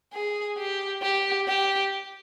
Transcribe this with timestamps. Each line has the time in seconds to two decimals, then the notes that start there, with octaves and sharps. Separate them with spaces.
0.13 G#4
0.58 G4
1.02 G4
1.48 G4